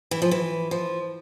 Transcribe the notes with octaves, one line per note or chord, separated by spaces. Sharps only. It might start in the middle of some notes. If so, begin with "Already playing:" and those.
E3
F3
E3
F3